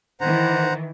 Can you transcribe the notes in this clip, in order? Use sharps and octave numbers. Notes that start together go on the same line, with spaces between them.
D#3 E3 C5 F#5 A#5